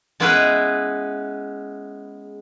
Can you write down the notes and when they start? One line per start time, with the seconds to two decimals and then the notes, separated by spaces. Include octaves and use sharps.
0.20 G#3 B3 C#4 E4 G#4 B4